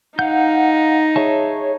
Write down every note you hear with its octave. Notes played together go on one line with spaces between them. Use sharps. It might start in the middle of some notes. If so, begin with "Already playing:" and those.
D#4 F5 F#5 G6
G#4 C#5 E5 A5